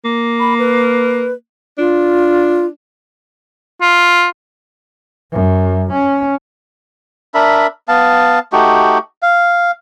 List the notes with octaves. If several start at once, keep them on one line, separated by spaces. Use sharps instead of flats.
A#3
B5
B4
D4 F4
F4
F#2
C#4
D4 A#4 E5 B5
B3 F5 A5
A3 D#4 F#4 G4
F5